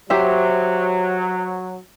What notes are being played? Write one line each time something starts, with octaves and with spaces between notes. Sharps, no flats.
F#3 G4 C5 E5